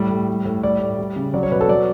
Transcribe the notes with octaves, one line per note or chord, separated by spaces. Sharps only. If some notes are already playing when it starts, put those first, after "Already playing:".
Already playing: A2 G3
A2
G3
A2
G3 D5
A2
G3
C#3
F#3 D5
C#5
B2 B4
A4
F#3 D5